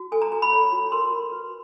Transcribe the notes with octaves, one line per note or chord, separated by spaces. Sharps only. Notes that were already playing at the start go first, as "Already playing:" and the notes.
Already playing: F#4
A4 G#5
A#5
F#4 A#5
B5
C#5
F#4
A#4 C6
F#4
B4